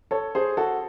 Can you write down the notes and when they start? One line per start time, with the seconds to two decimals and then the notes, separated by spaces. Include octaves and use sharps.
0.11 A4 C#5
0.35 G#4 C5
0.57 F#4 A4